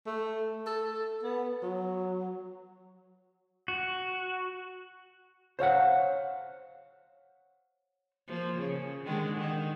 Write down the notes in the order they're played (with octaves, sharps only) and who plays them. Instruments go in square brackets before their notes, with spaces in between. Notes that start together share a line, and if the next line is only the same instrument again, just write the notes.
[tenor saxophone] A3
A4
B3
F#3
[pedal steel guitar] F#4
[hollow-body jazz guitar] C5 C#5 F5 F#5
[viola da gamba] F3 A#3
C#3
D3 D#3 G#3
D#3